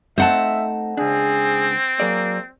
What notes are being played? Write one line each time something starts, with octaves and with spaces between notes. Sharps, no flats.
A3 C4 D#4 C5 E5 F#5 A5
C#2 C4 D4 G#4
F#3 A#3 G#4 D5